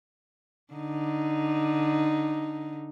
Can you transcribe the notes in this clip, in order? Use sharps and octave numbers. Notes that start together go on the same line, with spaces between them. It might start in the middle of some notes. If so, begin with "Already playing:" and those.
D3 D#4